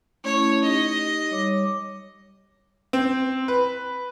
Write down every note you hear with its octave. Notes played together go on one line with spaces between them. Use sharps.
A3 C#4 E4 C#5
D#4 G4 D#5
G3 C#5 D6
C4
B4